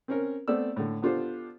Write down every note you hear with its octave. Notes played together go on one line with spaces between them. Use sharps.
C4 C#4 A#4
A3 B3 C4 D5 E6
A2 D3
B3 D4 F4 G4 A4 C5